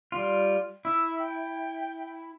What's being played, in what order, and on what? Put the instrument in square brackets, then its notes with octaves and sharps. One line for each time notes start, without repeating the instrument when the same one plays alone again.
[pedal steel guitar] G3 F4
[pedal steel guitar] E4 [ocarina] E6
[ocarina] G5